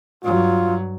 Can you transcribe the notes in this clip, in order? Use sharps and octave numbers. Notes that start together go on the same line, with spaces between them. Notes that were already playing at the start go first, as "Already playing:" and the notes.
G2 F#3 F4